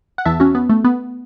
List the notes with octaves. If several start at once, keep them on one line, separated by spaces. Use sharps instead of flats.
F#5
E2 E3 E5 A5
C#4 F#4
B3
A3
B3